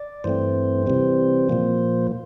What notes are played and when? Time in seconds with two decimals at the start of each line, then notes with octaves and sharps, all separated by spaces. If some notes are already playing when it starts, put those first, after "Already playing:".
Already playing: D5
0.24 G2 E3 A3 C4 C5
0.87 C3 E3 G3 C4
1.50 A#2 F3 A#3